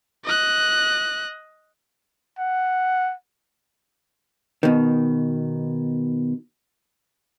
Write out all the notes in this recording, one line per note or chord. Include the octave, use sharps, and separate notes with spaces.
D#5 F#6
F#5
B2 D#3